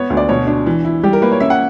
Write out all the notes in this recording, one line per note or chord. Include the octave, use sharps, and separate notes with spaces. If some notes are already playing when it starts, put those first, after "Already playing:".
Already playing: B3 C#5
D2
D5
B2 C#5
D4
E3
E4
G3 G4
A#4
A#3 B4
C#5
C#4 E5
F#5